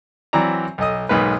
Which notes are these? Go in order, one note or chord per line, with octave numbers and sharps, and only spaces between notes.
E3 F#3 C4 E4 D5 A#5
B1 A4 D#5 D#6
B1 G#2 A#3 D#4 B4